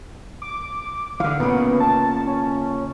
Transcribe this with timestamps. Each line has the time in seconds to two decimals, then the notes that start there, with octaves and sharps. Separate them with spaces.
0.42 D6
1.20 D3 E3 F5
1.40 A#2 C#3 B3
1.80 A5
2.27 C#4